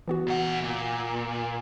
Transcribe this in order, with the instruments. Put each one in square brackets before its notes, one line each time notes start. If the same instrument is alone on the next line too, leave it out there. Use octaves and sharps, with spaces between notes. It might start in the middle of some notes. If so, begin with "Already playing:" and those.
[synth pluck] E3 B3 F#4
[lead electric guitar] A#2 F#5
A#2